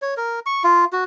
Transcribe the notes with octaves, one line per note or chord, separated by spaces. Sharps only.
C#5
A#4
C#6
F4
F#4